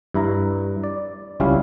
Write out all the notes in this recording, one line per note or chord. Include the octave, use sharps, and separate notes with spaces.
G2 E4 A#5
D5
C#2 G3 C#4 E4 F5